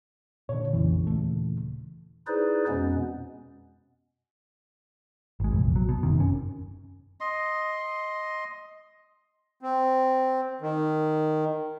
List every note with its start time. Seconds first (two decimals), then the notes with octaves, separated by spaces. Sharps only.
0.49 A#2 D3 C#5
0.73 A#1 F2 A#2 C#3 E3
1.07 D#1 A3
2.27 D#4 E4 G#4 B4 C5 D5
2.68 F2 B2 G#3 B3 C#4
5.40 G#1 G#3
5.51 F1 A#1 E2
5.76 F#3
5.89 B2
6.03 F#1 C3 D#3
6.19 F#2 C#4
7.21 D#5 C6
9.61 C4
10.61 D#3